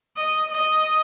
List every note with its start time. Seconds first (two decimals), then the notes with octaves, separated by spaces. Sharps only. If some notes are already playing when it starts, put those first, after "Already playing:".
0.17 D#5
0.52 D#5